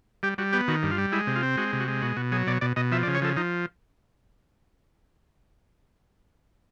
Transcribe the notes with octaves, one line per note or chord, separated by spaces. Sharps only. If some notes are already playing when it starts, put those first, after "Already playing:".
G3 G4
G3 F#4
B3 G4
D#3 F#4
G2
F4
G3
G#3 E4
C3
F4
C4
G#3 F#4
C3
F#4
G#3
B2 F#4
B2 F#4
F#3 G#4
B2 D5
B2 D5
B2 D#5
F3 E5
D5
C#3
C#5
F3 A4
F3 D#4